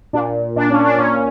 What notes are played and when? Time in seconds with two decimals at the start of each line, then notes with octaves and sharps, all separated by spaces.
0.13 A#2 D4
0.56 A#2 D4
0.70 C#4
0.85 D4
0.98 A#2 C#4